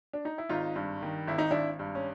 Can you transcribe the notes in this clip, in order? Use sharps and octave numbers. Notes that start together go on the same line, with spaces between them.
D4
D#4
E4
G#1 D#4 F4
G2
D#3
G#1 E4
D#4
G#1 D4 E4
G2
C#4